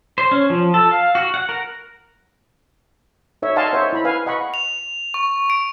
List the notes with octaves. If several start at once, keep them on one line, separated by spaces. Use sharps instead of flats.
C5
C#4
F3
A4
F5
F#4
F#5
A#4
D#4 C#5 E5
D#5 F5 F#5 G#5 A5 C6
C5 C#5 D#5 E5
E4 B5
B4 F5 G#5
D#5 F#5 B5 C#6
F7
C#6
D7